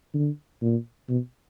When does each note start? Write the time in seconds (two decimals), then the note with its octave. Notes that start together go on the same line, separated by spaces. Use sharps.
0.14 D3
0.62 A#2
1.09 B2